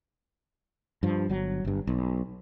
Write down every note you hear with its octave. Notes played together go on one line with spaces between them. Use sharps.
G2 F3
G1 F#3
G1 G2
B1